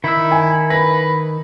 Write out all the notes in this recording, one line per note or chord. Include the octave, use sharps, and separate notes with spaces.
D#3 D#4 E4 E6
G#5
B4 B5 A#6